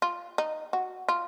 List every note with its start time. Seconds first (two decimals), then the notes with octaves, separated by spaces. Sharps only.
0.02 F4
0.38 D#4
0.73 F#4
1.08 F4